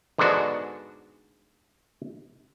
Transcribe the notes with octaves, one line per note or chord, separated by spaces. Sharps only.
G#2 D3 G#3 B3 D4 F#4